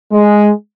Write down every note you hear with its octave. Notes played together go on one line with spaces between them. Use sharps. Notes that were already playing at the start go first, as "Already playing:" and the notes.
G#3